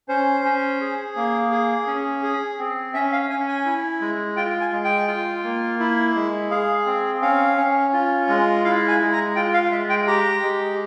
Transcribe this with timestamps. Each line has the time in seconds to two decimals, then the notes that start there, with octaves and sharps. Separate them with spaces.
0.09 C#4 C5
0.45 C#4
0.80 G#4
1.16 A#3
1.51 G#4
1.87 C#4
2.23 G#4
2.58 C4
2.94 C#4 E5
3.12 F5
3.30 C#4 G#5
3.48 G#5
3.65 E4
4.01 G#3
4.36 F4 G5
4.61 G#5
4.72 G#3
4.84 G5
5.08 F4
5.44 A#3
5.79 E4
6.15 G#3
6.51 G#4 F5
6.86 C4
7.22 C#4 F5
7.57 C#4
7.93 F4
8.29 G#3
8.64 E4 F5
8.88 G#5
9.00 G#3
9.12 A#5
9.36 F4 G5
9.54 F5
9.72 G#3 E5
9.90 G5
10.07 G4 A#5
10.43 G#3